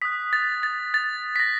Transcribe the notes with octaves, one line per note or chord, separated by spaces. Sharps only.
D#6 F#6 B6
A6
A6
A6
B6
A#6